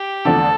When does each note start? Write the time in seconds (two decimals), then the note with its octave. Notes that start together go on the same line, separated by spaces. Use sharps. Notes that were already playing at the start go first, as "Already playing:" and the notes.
Already playing: G4
0.25 E2 D3 F3 A3 D4 A4